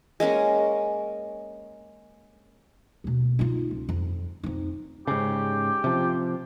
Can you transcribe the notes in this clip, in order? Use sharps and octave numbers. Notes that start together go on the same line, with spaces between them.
G#3 A#3 C#4 A#4
D#2 B2
D#4 F4
C#2
F2
F2 D#4
G#2 C#3 G4
C3 F3